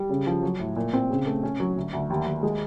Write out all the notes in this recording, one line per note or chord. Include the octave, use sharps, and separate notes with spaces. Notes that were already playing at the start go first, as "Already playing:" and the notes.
Already playing: G3
C#3
F3
F#3
A2
A#2
C4
C#3
A3
C#4
F#3
D2
D2
D#2
D#2
G#3